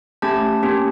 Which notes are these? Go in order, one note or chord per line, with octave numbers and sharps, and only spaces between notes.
A3 C#4 G4 A5
A#3 C#4 G4